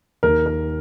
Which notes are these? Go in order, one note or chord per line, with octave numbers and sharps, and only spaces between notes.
D#2 D#3 A#3 A#4
A#4